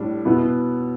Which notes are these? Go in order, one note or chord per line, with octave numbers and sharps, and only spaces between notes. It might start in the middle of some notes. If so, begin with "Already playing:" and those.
Already playing: A2 G3 D4
B2 B3 E4